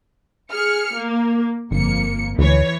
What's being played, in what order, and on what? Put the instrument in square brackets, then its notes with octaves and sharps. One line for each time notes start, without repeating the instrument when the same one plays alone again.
[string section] G#4 F6 C#7
A#3
[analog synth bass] G1 [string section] F2 A#3 C#7
[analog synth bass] D2 [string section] E3 C#5